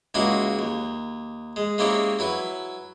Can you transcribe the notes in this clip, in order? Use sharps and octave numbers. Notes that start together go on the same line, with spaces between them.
C#2 G#3 A#3 E4 F#4 G#5
D#2
G#3
G#3 A#3 C4 C#4 E4 G4
F#3 E4 B4